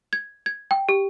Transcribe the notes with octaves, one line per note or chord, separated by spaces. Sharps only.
G#6
G#6
G5
G4